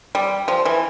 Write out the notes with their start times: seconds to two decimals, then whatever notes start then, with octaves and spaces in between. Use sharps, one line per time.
0.15 G3
0.48 F3
0.65 E3